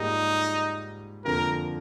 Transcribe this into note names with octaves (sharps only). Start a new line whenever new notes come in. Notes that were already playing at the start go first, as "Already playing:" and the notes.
Already playing: G#2 G3 A#3 D#4 F4
F2 D3 F3 A#3 A#4